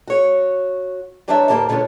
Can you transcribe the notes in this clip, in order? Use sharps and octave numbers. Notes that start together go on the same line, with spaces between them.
F#4 C#5
E3 G3 D4 D#4 C#5 E5
D2 A2 A#3 G4 A5
B2 D3 F3 B3 C#4